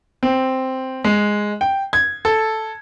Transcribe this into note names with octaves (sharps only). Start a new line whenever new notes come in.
C4
G#3
G5
G#6
A4